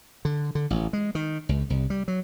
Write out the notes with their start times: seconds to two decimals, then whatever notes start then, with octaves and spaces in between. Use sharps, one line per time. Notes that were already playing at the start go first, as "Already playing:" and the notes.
0.25 D3
0.55 D3
0.70 A1
0.93 G#3
1.15 D#3
1.49 C#2
1.70 C2
1.90 G3
2.08 F#3